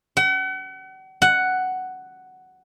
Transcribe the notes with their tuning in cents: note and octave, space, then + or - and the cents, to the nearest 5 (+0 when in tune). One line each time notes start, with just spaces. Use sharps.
F#5 +40
F#5 +5